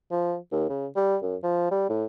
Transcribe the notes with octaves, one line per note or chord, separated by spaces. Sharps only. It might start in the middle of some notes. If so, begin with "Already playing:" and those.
F3
D#2
C#3
G3
F#2
F3
G3
A2